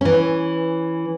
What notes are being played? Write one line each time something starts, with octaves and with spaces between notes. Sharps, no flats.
E3 C#4